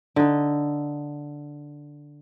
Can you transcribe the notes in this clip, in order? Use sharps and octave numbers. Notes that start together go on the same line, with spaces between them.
D3 D#4